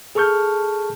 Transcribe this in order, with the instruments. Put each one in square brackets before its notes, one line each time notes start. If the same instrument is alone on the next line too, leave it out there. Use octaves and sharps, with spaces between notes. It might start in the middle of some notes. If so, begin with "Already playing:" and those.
[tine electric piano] G#4 A4 A5 C#6 F6 G6